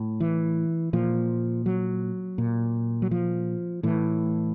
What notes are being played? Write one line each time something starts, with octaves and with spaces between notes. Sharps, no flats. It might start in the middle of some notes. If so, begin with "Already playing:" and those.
Already playing: A2
E3
A#2 F3
F#3
A#2
F#3
F3
A2 E3